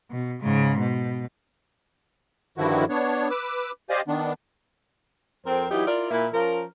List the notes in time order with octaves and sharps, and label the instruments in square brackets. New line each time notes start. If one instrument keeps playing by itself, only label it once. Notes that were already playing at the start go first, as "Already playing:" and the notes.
[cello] B2
G#2 C#3
B2
[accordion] G2 D3 D#3 F3 E4 F#4
B3 D4 C#5
B4 D6 E6
G4 C5 D5 D#5 F5 G#5
D#3 B3 D4
[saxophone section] F2 C4 A#4 C5
E3 F#3 D#4 E4 G4
E4 F4 A#4 D5
A#2 A#3 E4
F3 C#4 F4 A#4